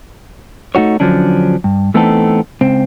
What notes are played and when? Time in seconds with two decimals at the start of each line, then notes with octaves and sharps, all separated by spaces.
0.75 A3 D#4 F#4 C#5
1.00 D3 F3 F#3 C#4 D4
1.64 G2
1.94 E3 A3 B3 C4 D#4 A4
2.61 C#2 C4